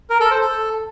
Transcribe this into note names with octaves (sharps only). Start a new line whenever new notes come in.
A#4
A4
C5
A4